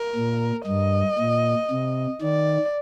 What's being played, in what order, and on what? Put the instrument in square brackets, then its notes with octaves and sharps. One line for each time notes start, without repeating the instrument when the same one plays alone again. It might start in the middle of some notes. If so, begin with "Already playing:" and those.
Already playing: [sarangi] A#4
[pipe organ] A#2
[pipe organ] G2 [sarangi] D#5
[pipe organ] A#2
C3
[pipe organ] D#3 [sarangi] D5